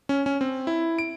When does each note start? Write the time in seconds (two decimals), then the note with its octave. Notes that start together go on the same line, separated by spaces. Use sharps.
0.09 C#4
0.26 C#4
0.41 C4
0.67 E4
0.99 D7